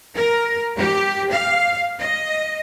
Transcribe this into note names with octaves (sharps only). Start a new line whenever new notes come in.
A#4
G4
F5
D#5